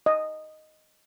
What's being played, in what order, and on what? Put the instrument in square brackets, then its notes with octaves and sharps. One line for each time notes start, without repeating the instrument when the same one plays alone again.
[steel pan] D#5